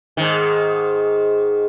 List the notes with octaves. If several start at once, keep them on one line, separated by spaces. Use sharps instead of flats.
G#2 D#3